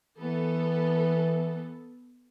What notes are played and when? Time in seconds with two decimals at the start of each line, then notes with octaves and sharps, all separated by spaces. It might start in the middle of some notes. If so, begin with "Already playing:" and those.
0.19 E3 B3 A4